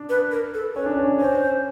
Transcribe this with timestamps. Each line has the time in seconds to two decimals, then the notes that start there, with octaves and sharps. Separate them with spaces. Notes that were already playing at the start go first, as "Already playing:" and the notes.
Already playing: D4
0.09 B4
0.32 A#4
0.54 A4
0.76 C#4 B4
0.86 D4
0.97 C#4
1.08 D4
1.18 C#4 C5